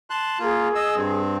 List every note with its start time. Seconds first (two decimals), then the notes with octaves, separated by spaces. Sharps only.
0.10 A5 C6 F#6
0.39 A#3 F4 G#4
0.75 D#5 E6
0.95 G2 C4